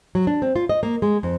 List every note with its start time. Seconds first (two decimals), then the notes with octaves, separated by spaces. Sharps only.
0.15 F#3
0.27 D4
0.42 C4
0.56 F4
0.69 D#5
0.83 A#3
1.02 G#3
1.23 F2